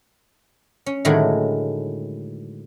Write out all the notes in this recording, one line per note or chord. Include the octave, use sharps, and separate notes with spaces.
C#4
A2 D3 D#3 F#3 G#3 A3